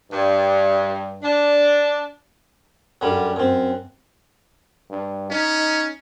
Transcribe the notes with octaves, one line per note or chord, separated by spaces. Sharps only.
G2
D4
F#2 D3 G3
F#2 C4
G2
C#4 D#4